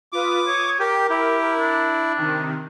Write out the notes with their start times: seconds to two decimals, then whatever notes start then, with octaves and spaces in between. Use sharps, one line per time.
0.12 F4 B4 D6 D#6
0.47 C#5 C#6 D#6 G#6
0.80 G4 A#4 G5
1.10 E4 G4
1.59 D4
2.16 C3 D#3